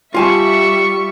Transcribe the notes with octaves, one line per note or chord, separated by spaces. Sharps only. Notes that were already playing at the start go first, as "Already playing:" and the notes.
G3 F4 E5 G#5 A5 C#6